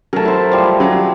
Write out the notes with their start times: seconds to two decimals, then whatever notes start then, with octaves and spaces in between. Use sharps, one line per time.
0.13 F#3 A3 A#4 A5
0.25 E4 C5
0.51 F3 G3
0.80 F#3